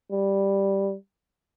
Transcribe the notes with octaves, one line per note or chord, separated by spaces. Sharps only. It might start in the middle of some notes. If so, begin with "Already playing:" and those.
G3